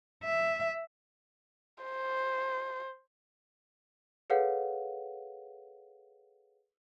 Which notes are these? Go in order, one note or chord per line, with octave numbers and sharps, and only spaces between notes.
E5
C5
G#4 A4 B4 C#5 F5 F#5